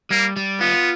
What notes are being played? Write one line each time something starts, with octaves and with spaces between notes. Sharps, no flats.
G3 A#3
G3
B3 F4